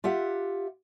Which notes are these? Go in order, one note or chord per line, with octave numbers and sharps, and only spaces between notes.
F4 G4 E5 F#5